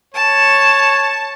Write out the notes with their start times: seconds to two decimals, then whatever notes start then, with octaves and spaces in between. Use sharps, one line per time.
0.14 C#5 A5